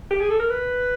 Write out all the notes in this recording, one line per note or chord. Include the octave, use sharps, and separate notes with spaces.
G4
G#4
A4
A#4
B4